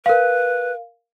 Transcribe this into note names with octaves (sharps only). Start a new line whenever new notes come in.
A#4 B4 F5